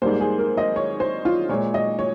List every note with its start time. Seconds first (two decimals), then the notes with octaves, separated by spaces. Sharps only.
0.02 G#2 G3 A#3 C5
0.20 G#4
0.39 A#4
0.57 D#5
0.76 C#5
1.00 C5
1.25 F4
1.49 A#2 G#3 C#5
1.74 D#5
1.99 C#5